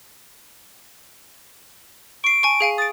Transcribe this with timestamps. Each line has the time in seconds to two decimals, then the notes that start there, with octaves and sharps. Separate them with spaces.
2.24 C#6 C7 D7
2.43 G#5 A5 C#6
2.60 G#4 F5 G#5
2.78 D#6 A6 D7